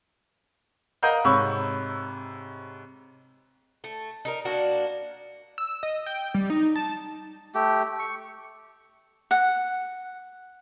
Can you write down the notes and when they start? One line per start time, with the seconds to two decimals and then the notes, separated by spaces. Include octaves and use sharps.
1.03 A#4 D#5 F5 F#5 A#5 G6
1.25 G#2 C3 C#5 B5 C#6 E6
3.84 A3
4.25 D#4 A4 A#4
4.45 A#3 D4 F#4
5.58 E6
5.83 D#5
6.06 G5
6.34 G3
6.50 D#4
6.76 A5
7.55 A3 G4
7.99 C#6
9.31 F#5